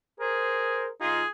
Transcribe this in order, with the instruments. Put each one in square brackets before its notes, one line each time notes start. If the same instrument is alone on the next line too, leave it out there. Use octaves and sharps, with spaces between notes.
[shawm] G#4 [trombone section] A#4 C5
[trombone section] B1 D#4 F4 [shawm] G#4